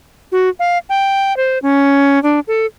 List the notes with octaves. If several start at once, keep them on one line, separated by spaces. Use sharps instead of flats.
F#4
F5
G5
C5
C#4
D4
A4